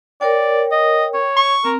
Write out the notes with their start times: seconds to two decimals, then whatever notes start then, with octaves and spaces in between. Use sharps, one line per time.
0.21 A#4 C#5 D5 G5
0.72 D#5
1.14 C#5
1.37 C#6
1.65 C4 A#4